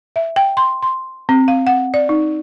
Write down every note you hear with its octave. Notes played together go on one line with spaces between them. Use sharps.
E5
G5
C6
C6
C4
F5
F#5
D5
D#4